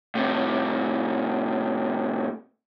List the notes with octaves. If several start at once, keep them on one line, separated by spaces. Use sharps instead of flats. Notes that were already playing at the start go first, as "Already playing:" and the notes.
A2 C3